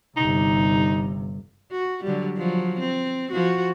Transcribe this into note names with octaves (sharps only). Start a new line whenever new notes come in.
G1 C3 D#4
F#4
D3 F#3 G3
F3 F#3
C4
F3 F#4